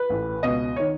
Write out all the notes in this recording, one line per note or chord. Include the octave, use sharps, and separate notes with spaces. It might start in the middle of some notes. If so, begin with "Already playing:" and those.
Already playing: B4
A1 A2 E3
C#2 B2 D#5
D#3 C#5